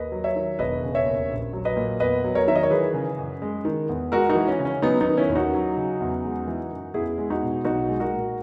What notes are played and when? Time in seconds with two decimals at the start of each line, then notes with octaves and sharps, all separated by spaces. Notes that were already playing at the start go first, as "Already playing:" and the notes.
Already playing: D#2 B4 D#5
0.12 F#3
0.24 C#5 E5
0.36 D#3
0.59 E1 B4 D#5
0.83 C#3
0.95 C#5 E5
1.06 D#2
1.29 A#1
1.53 F#3
1.65 B4 D#5
1.77 A#2
2.00 E2 B4 D#5
2.24 F#3
2.35 A#4 C#5
2.48 D#3 E5
2.55 D#5
2.63 C#5
2.70 E3 G#4 B4
2.94 C#3
3.18 F#2
3.42 G#3
3.65 D#3
3.89 E2
4.12 G#3 F#4 A#4
4.29 D#4 F#4
4.35 E3
4.48 C#4
4.59 C#3
4.65 C#4
4.82 F#3 B3 D#4
5.00 B3 D#4
5.06 D#3
5.17 C#4 E4
5.29 D#2
5.35 D#4 F#4
5.54 F#3
5.77 C#3
6.00 E2
6.24 G#3
6.47 E3
6.71 F#2
6.94 E2 E4 G#4
7.18 G#3
7.30 D#4 F#4
7.42 B2
7.65 B1 D#4 F#4
7.89 G#3
8.00 F#4 A#4
8.12 A#2